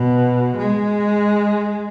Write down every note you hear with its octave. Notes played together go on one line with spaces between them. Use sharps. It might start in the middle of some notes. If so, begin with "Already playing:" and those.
Already playing: B2
G#3